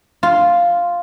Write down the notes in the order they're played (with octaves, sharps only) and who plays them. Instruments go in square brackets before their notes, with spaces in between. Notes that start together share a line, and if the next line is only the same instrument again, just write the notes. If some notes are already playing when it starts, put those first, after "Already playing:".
[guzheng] F4